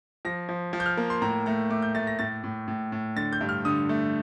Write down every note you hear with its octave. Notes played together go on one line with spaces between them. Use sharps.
F3 A#6
F3
F3
G6
F6
A#3
C6
A2 A#5
A3 A#5
A3 D6
G6
A3 A6
A#6
A2 A6
A2
A2
A2
D3 A6
G6
G2
F6
D3 D#6
A3